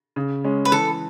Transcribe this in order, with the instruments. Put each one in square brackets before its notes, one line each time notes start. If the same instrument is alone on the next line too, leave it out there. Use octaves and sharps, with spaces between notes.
[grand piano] C#3
G#3 C#4
[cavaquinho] B4
[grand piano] E3 [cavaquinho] A4